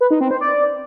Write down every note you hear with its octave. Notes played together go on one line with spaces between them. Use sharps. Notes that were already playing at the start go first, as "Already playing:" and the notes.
B4
D#4
C4
C5
D5